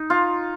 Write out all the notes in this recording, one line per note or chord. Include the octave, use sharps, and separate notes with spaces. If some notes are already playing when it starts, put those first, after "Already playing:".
Already playing: D#4
F4